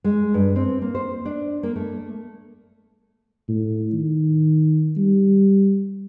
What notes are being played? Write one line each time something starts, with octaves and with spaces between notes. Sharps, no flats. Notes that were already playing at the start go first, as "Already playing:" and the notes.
G#3
G2
C4
A#3
C5
D4
A#3
A3
A2
D#3
G3